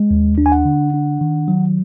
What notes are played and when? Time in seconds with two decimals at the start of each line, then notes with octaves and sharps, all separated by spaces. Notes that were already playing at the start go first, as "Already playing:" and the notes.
Already playing: G#3
0.11 D#2
0.38 D4
0.46 G#5
0.52 F#5
0.65 D3
0.94 D4
1.21 D#3
1.48 F#3